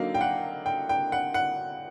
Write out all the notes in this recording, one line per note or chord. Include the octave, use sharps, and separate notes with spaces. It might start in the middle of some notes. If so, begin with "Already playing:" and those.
Already playing: D3 F#3 A#3 D#4 F5
G5
F#5
G5
G5
F#5
F#5